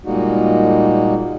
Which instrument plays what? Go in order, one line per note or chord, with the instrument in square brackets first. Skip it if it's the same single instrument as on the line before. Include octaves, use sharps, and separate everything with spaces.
[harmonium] A#2 G3 G#3 A#3 D#4 F#4